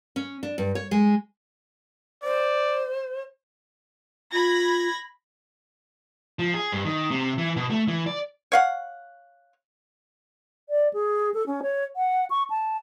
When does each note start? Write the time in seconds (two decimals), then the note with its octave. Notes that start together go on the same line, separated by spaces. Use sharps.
0.16 C#4
0.43 D4
0.58 G2
0.75 C#5
0.91 G#3
2.23 C5 D5
4.33 F4 B5 G#6 A#6
6.39 F3
6.54 G#4
6.72 G2
6.85 D#3
7.11 C3
7.38 E3
7.56 B2
7.70 A3
7.88 E3
8.07 D5
8.52 C#5 F5 F#5
10.69 D5
10.93 G#4
11.34 A4
11.46 C#4
11.62 C#5
11.96 F#5
12.30 C#6
12.50 A5